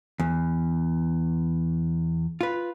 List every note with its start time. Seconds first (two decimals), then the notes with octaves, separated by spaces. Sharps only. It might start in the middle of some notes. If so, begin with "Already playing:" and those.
0.20 E2
2.41 F4 B4